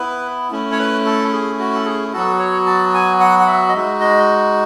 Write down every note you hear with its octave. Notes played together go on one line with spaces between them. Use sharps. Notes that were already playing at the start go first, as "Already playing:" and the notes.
Already playing: B3 E4 B4
A3 C#4 E4
C#5
B4
A4
G#4
F#4
A4
G#4
F#3 B3 F#4 A4
C#5
A5
G#5
F#5
F#5
E5
D#5
G#3 D#4 F#4 E5
D#5